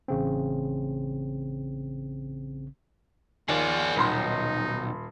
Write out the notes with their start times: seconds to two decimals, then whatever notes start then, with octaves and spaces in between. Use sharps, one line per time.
0.08 A1 C#3 C4
3.49 D#2 F4 G#4 D5
3.96 D#1 B1 D#4 B5 C6